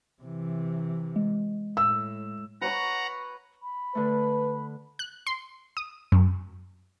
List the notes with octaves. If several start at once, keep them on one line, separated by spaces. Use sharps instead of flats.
C3 E3
G#3
A2 E6
B4 C#5 F#5 A#5 B5
B5
D3 A3 B4
F#6
C6
D#6
F#2